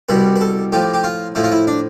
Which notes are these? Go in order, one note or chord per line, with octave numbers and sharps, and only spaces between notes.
C2 B2 G3 B4
B4
A4
A2 F3 G4
G4
F4
A2 F3 E4
F4
E4
D4